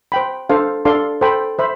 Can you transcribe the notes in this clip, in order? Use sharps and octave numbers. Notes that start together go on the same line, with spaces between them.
C5 G5 B5
D4 A4 C5 F5
D4 A4 D5 F5 C6
A4 C5 G5 B5
C5 E5 B5